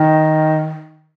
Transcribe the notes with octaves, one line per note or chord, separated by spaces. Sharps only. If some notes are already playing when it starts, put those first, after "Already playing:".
Already playing: D#3